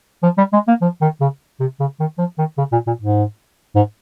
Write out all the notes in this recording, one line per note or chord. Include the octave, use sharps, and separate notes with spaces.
F3
G3
G#3
A#3
F3
D#3
C#3
C3
C#3
D#3
F3
D#3
C#3
A#2
A#2
G#2
G#2